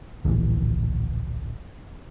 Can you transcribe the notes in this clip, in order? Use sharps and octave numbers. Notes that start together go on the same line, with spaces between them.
D1 A#1 E3